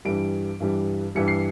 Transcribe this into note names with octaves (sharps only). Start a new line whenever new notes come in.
G2 E3 G3 D7
G2 E3 G3
G2 E3 G3 C#7
C7